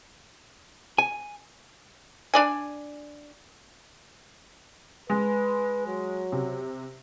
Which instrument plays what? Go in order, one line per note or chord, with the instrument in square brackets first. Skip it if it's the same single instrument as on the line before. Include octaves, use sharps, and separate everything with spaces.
[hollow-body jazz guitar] G#5
[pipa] D4 D5 G#5
[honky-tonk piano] G#3 [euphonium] B4
[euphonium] F#3
[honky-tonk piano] C3